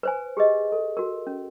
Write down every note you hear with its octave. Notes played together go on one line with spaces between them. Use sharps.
B4 C5 G#5
G4 G#4 B4 D#5
A4
F#4 A#4
C#4